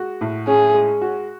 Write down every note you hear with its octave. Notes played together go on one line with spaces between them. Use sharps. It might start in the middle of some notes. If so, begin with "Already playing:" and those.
Already playing: G#3 F#4
A2
C#4 G#4
G#3
F#4